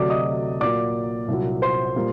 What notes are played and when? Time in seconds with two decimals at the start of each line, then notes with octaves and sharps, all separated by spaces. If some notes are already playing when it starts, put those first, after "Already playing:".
Already playing: D2 C3 F#3 A3 D5 D6
0.10 D#5 D#6
0.60 A#2 F#3 A#3 D5 D6
1.28 C2 A#2 F#3
1.62 C5 C6
1.96 A#2 G3 A#3